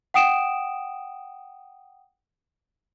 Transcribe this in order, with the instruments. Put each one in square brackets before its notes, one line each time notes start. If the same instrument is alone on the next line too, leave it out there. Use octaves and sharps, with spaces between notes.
[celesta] F#5 G5 D#6 D7 E7